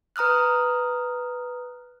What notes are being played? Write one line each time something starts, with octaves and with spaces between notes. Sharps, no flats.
B4 A#5 D#6 F6 F#6